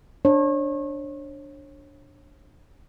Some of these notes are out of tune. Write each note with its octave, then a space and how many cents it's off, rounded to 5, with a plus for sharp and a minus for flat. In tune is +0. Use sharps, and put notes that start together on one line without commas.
D4 +0 C#5 -35